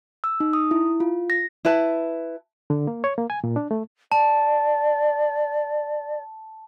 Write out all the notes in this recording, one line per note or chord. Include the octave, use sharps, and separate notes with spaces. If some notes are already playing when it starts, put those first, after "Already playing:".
E6
D#4
D#6
E4
F4
A#6
E4 B4 A5
D3
A#3
C#5
A#3
G#5
A#2
D4
A3
D5 A5